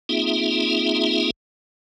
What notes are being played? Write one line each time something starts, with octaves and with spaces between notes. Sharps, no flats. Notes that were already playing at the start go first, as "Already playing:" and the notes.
A#3 C4 D#4 F4 G#4 E5